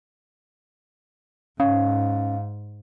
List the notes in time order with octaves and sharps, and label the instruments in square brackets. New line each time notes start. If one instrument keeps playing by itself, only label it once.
[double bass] G#2 [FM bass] C#4 [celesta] F5